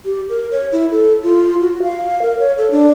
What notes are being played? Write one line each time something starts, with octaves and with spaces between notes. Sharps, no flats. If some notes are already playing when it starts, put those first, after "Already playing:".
G4
A#4
C#5
E4
A4
F4
F#4
F5
A#4
C#5
A4
D4